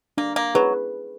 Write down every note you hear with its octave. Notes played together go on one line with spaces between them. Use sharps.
A#3 D4
A#3
F#3 G#4 B4